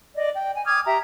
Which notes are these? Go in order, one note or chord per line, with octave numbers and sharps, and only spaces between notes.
D5 D#5
G5
G#5
D6 D#6 F6 G#6
G4 E5 A#5